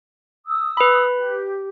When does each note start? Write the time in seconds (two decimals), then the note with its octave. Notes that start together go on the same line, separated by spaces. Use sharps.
0.45 D#6 E6
0.77 B4 B5
1.16 G4